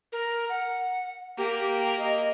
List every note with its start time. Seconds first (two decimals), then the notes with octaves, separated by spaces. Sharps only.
0.12 A#4
0.49 F#5
1.38 A#3 G4
1.99 D#5